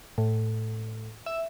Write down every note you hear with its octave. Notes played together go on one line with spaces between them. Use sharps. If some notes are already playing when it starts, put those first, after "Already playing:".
A2
E5